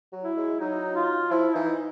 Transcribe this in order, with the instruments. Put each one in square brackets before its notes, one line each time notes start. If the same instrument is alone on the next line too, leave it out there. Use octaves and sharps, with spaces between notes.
[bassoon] F#3
[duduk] E4
[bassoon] G#3
[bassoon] F#3 [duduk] D#4
[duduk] F4
[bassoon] F3 [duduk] E4
[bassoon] E3 [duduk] D#4